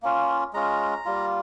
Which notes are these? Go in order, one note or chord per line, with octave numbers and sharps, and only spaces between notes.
A#3 C#4 F4
G#3 C#4 F4 A#5
G3 A#3 F4